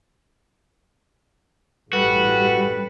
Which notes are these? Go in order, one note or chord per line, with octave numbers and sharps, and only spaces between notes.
A1 G2 G3 F#4 G4 A4 B4